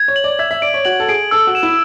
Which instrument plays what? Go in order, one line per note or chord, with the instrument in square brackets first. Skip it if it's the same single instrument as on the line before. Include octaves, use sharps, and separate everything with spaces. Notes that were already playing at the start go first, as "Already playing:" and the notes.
Already playing: [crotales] G#6
[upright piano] C#5
[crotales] F#7
[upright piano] D5
[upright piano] E5 [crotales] G#6
[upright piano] E5
[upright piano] D5 [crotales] D7
[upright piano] C#5
[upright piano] F#4 [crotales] F#7
[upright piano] A4
[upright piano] G#4 [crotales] D7
[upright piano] A4 [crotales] E6
[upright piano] F#4
[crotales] E7
[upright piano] E4